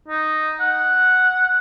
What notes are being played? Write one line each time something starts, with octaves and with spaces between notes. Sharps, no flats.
D#4
F#5